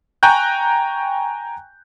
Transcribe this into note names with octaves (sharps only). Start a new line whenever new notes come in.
G5 G#5 A#5 C#6 F#6 G6